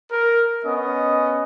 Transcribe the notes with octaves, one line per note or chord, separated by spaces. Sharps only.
A#4
B3 C#4 D#5